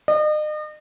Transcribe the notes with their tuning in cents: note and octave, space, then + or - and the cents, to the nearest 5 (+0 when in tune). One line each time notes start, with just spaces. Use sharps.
D#5 -40